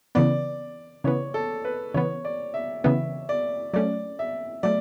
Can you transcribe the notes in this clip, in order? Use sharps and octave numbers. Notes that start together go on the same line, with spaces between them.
C#3 E3 B3 D5
C#3 E3 B3 C#5
A4
B4
C#3 E3 B3 C#5
D5
E5
C#3 E3 B3 E5
D5
F#3 A3 C#4 D5
E5
F#3 A3 D5